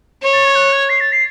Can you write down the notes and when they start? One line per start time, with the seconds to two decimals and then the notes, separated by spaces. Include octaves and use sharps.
0.22 C#5
0.33 A6
0.45 G#6
0.56 F#6
0.72 G#6
0.90 C7
1.00 A6
1.12 C7